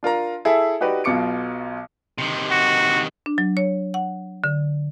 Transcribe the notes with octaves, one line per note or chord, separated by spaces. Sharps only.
D4 F4 A#4 A#5
E4 G#4 A4 E5
D#4 F#4 G4 B4 D5
B1 B2 F4 D6 C#7 D7
C3 D#3
F#4
D4
F#3
C#5
F#5
D3